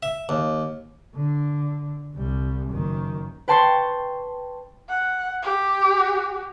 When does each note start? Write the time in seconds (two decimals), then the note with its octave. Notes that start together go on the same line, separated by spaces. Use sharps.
0.03 E5
0.29 D#2
1.15 D3
2.15 C2 G3
2.70 F#1 D#3
3.48 B4 G5 A5 C6 C#6
4.89 F#5
5.42 G4